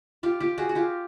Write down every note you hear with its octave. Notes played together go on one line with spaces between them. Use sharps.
F4 G4
F4 G4
F#4 G#4
F#4
F4 G4